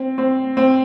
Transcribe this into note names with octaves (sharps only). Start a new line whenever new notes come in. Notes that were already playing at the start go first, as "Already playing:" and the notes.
Already playing: C4
C4
C4